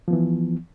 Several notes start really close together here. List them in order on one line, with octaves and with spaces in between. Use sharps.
F3 B3 E3